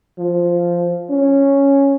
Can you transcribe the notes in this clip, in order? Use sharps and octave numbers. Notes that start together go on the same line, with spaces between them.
F3
C#4